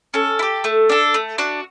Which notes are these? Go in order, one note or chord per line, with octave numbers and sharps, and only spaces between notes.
C#4 A4
E4
G4
A3
D4 A4
A3
D4 F#4